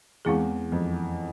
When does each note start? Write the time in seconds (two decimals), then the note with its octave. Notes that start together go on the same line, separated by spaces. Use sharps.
0.25 E2 E3 G#3 C4 E4 G#4
0.72 F2